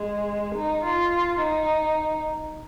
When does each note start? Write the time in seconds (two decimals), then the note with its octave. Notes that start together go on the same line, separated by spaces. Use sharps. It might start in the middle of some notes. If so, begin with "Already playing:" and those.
Already playing: G#3
0.55 D#4
0.84 F4
1.41 D#4